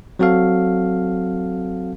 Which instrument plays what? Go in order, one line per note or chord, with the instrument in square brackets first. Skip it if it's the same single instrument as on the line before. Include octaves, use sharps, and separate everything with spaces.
[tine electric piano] F#3 C4 F#4 A4 F5